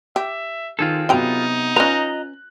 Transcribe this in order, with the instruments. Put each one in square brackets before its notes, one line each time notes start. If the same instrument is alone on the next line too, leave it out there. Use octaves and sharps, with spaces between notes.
[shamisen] G4 [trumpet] E5
[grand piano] D#3 [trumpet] C4 [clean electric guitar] F4 G#4 A4
[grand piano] C3 B3 [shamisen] F#3 G5 A#5 [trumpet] D#4
[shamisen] C#4 B4 [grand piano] F4 F#6 [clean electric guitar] D#5 A#5